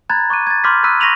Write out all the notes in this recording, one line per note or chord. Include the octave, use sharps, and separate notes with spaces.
A#5 B5 F#6 G#6 A6
C#6 D6 F#6 D#7
G#6 A6
B5 C6 D6 F6 G6 B6
B5 E6 F#6 B6 D#7
C#6 A#6 B6 D#7 F7 F#7